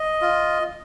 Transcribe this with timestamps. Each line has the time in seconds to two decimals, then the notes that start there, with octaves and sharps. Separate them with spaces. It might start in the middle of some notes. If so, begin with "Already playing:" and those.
Already playing: D#5
0.22 F4